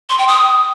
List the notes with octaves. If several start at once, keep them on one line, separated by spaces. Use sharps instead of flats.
C6
G5
D#6